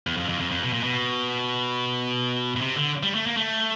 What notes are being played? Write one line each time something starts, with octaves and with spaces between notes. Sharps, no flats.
E2
F2
F2
F2
F2
B2
A#2
B2
B2
C3
D3
G3
A3
A#3
A3